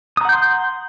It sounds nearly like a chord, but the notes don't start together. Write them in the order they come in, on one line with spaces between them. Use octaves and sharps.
D#6 A#5 F#5 G6 C6